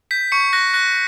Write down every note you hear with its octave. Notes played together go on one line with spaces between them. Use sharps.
G6 B6
C#6 C#7
F#6 A#6
F#6 A#6